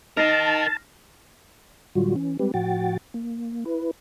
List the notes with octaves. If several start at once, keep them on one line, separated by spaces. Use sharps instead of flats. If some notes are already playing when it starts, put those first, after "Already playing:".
D#4 A#4 D#5 A5 F6 A#6 C7
A2 D3 F#3 G3 F4 F#4
E3 C#4
G3 G#3 C4 G4 B4
A2 F3 F#4 F#5 G5 A6
A#3
E4 B4